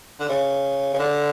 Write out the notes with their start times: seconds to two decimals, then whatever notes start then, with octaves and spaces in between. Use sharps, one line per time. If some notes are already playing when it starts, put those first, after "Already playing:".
0.20 D3
0.29 C#3
0.93 C#3
0.99 D3